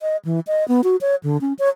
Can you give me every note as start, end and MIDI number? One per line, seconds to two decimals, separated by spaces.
0.01 0.17 75
0.25 0.40 52
0.47 0.67 75
0.68 0.81 59
0.84 0.96 66
1.01 1.16 73
1.23 1.40 50
1.41 1.53 61
1.59 1.69 73